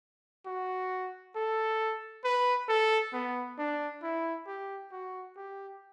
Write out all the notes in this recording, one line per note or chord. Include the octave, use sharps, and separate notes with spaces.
F#4
A4
B4
A4
B3
D4
E4
G4
F#4
G4